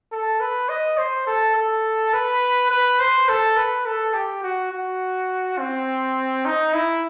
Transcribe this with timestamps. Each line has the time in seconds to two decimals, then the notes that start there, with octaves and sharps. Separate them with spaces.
0.12 A4
0.40 B4
0.69 D#5
0.98 C5
1.27 A4
1.55 A4
2.13 B4
2.70 B4
3.00 C5
3.29 A4
3.57 B4
3.86 A4
4.14 G4
4.43 F#4
4.72 F#4
5.59 C4
6.45 D#4
6.74 E4